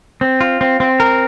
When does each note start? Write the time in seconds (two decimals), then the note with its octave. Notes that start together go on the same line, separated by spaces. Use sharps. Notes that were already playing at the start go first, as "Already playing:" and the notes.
0.21 C4
0.41 F4
0.61 C4
0.80 C4
1.00 A#4